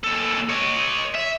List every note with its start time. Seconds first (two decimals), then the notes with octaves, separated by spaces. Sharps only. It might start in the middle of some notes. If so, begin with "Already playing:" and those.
0.04 D#2 A4
0.49 C#5 D#5
1.14 E5